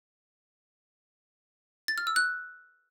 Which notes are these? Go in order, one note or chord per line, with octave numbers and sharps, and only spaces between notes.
A6
F6
E6
F#6